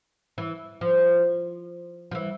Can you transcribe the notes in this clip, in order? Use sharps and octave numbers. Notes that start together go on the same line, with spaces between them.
E3
F3
F3
E3